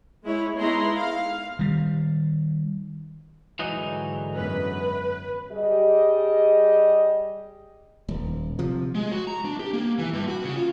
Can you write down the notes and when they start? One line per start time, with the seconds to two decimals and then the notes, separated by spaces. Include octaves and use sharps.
0.24 G#3 E4 C#5
0.57 G#3 B3 D#4 E4 A#5 C6
0.96 F5
1.59 D#3 G3
3.59 G#2 D3 E3 F#3 D#4 F#6
4.35 F#2 B3 C#4 B4
5.52 G3 G4 G#4 D#5
8.08 D#1
8.59 C3 F3
8.95 G#3
9.12 F#4
9.27 A#5
9.45 D4
9.60 G4
9.73 A#3
9.98 E3
10.13 G2
10.28 F#4
10.43 C#3
10.56 F4